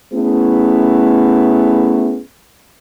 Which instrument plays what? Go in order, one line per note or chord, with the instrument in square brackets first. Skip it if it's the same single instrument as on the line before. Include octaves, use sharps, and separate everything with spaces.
[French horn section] A3 B3 C#4 E4 G#4